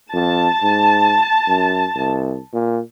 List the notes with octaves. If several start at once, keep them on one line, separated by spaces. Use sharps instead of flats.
F2 A5
G#2
F#2
C2
A#2